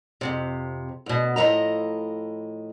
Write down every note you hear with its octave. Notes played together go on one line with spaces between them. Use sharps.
F2 A2 C3
D2 B2
A2 F3 A3 D#5 A#5